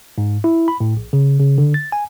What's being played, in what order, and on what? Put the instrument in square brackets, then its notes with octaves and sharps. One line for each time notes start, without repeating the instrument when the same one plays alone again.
[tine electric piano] G#2
E4
B5
A2
A#1
C#3
C#3
D3
A6
G#5